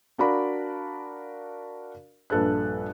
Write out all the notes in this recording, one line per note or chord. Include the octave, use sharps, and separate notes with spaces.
D4 F#4 A#4 D5 F5 B5
A#1 G2 A4 B4 F#6